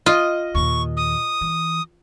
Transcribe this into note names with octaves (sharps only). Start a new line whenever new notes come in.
F4 D#5
D#2 A#2 C#6
D#6
E3